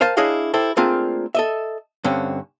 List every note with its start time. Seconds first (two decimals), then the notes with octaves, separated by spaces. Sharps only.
0.01 A#4 C5 F5 G#5 A5
0.17 D4 E4 G#4 C#5 D#5 F5
0.54 E4 G4 A4 C5
0.77 A3 A#3 C4 D4 F4 G#4
1.35 A4 D#5 E5
2.04 G2 D3 C4 C#4